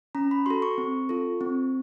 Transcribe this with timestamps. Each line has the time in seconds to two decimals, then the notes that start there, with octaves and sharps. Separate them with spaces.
0.15 C#4 A#5
0.31 B5
0.46 F#4 A4 C6
0.62 C#6
0.78 C4
1.09 F4 A4
1.41 C4